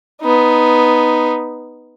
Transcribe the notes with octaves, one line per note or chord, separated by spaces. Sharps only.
B3 D#4